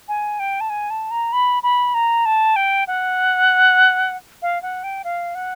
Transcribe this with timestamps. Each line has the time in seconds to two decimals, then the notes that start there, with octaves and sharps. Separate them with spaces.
0.08 G#5
0.39 G5
0.61 A5
0.70 G#5
0.90 A5
1.11 A#5
1.33 B5
1.63 B5
1.94 A#5
2.26 A5
2.56 G5
2.88 F#5
4.42 F5
4.62 F#5
4.84 G5
5.04 F5
5.35 F#5